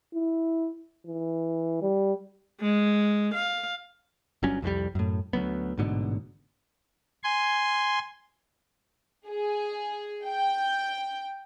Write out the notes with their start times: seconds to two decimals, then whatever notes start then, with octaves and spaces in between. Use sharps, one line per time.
0.15 E4
1.07 E3
1.82 G3
2.61 G#3
3.34 F5
4.43 G1 G2 F#3 C#4
4.62 C2 F2 E3 G3
4.95 F#2 A2
5.33 D2 F#3 B3
5.78 A1 G#2 B2 D3
7.23 G#5 C6
9.27 G#4
10.26 G5